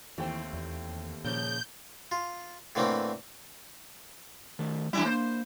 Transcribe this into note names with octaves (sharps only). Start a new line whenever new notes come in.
D#2 E3 A3 C4 G5
E2
A#2 C#3 F3 G6
F4
A2 D3 E3 A3 A#3 C4
D#3 A3
E2 G3 D4 E4 G#5
A#3 C5